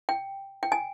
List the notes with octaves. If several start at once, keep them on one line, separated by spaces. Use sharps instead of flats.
G5
G5
G#5